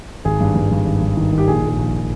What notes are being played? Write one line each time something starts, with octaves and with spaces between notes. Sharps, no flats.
G#1 G#4
G2
G2
G2
G#1
G#1
D#3
D#3
G4
A#1 G#4
A#1
G#4
A#1